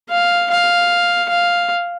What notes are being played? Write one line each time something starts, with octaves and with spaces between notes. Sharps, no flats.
F5
F5
F5